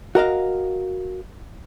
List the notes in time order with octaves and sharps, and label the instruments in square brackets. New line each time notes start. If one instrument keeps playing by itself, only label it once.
[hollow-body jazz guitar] F#4 A#4 D#5 F5